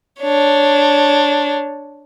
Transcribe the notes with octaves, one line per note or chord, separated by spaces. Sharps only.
D4 C#5